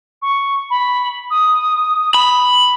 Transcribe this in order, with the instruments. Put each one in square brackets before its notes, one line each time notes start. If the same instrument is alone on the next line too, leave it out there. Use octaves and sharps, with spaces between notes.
[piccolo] C#6
B5
D#6
[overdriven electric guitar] B5